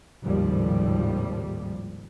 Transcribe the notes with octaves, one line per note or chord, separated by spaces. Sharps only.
G#1 D#2 A2 C#3 F3 G3